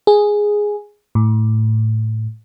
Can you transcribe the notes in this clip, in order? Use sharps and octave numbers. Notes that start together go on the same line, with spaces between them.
G#4
A2